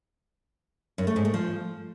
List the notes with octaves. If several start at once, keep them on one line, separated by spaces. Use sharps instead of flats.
F#2
A3
G#2
A3
F3